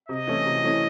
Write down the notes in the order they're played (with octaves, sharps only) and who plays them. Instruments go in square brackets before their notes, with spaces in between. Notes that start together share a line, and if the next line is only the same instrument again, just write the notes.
[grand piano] C3 [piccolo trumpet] D#5
[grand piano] E3 A3 C#4 E4
C3
E3 A3 C#4 E4